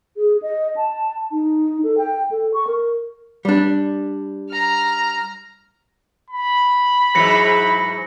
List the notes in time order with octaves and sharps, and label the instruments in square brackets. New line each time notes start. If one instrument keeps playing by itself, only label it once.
[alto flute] G#4
D#5
A5
D#4
A4
G5
A4
C#6
A#4
[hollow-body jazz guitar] G3 D4
[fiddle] A#5 F6
[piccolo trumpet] B5
[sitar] G#2 E3 F#3 [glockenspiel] A#6 C#7